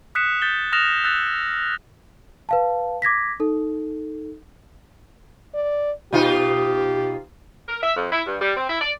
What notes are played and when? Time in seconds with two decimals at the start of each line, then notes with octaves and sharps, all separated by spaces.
0.15 D#6 F#6 B6 C#7 E7
0.42 G6 A6 B6 G7
0.73 D#6 F6 F#6 A#6 E7 F7
1.04 E6 F#6 A6 B6
1.27 C#7
2.49 B4 F5 A5
3.02 D6 G#6 A#6 B6
3.40 D#4 A4
5.54 D5
6.13 B2 D#4 F4 G4
7.69 A#4
7.83 E5
7.97 F2
8.12 E4
8.26 G2
8.41 G3
8.56 C4
8.70 E4
8.81 D5